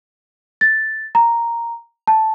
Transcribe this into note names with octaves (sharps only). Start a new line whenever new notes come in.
A6
A#5
A5